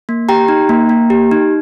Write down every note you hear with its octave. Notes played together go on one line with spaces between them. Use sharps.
A#3
G4 G5 A#5
D#4
A#3
A#3
G4
D#4